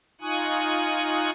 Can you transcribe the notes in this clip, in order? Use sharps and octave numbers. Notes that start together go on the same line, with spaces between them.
D#4 F4 G#5 C#6 D#6 F#6